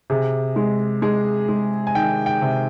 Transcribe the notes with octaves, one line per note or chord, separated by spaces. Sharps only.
C3 G#4
G#3
G#3 G#4
G#3
G#5
D#3 G5
G5
C3